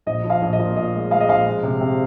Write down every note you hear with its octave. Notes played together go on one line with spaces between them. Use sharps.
A#1 D#5
F3
F5
A#1
D#5
A#2
A#2 D#5
G#3
G#3 F5
D#5
A#1 F5
G#3
C3
C3